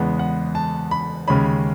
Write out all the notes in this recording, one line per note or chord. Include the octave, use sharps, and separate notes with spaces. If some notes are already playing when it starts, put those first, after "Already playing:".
Already playing: E2 C#3 G#3 B3 F#5
F#5
A5
B5
D#2 C#3 G#3 C#4 B5